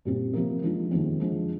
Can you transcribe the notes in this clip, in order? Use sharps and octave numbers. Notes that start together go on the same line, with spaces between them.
A#2 G3 C4
C3 F3 A#3
F3 G#3 D4 F4
F2 C3 D#3 G#3
D3 F3 G#3